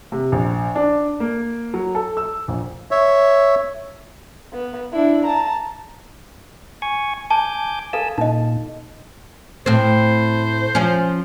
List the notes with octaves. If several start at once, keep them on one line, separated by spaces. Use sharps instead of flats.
C3
A#1
D4
A#3
F#3
A4
E6
A#1
C#5 E5
B3
D4 E4
A5 A#5
G#5 C#6
G#5 A5 D6 G6
A4 F5 G#5 A5 E6
A#2 D#4 D#5
A2 C4 C5
F3 C#4